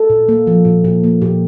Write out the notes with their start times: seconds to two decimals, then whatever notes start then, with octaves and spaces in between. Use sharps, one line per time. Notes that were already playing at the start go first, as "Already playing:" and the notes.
Already playing: A4
0.10 A#2
0.29 A#3
0.47 F3
0.65 A#2
0.84 A#2
1.04 A#3
1.22 A#2 G4